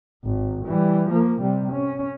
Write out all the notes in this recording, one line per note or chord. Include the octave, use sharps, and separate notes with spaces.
G#1
E3 G3
F3 A#3
C3 G3
C#4